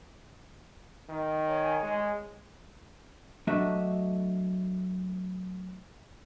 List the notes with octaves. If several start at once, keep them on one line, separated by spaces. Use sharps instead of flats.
D#3
C#5 G#5
G#3
F#3 A3 D4 F#4 D#5 E5